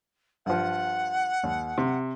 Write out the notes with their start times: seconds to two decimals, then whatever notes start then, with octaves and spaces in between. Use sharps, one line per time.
0.46 G2 F3 F#5
1.43 D#2
1.78 C3